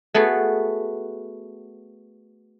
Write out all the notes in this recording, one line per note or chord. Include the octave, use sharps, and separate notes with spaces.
A3 B3 F#4 G#4